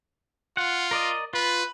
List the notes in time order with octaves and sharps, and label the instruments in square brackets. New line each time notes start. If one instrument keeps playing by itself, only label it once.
[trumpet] F4 [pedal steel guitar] F#5
[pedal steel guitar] A#4 D5 D#5
[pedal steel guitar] F4 [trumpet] B4